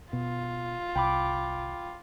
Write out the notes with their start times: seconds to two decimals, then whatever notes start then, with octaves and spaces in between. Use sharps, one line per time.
0.13 B2 F4
0.96 C2 G5 B5 D6